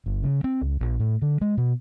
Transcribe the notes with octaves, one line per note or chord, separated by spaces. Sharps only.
G1
C#3
C4
C#2
A#1
A2
D3
G#3
B2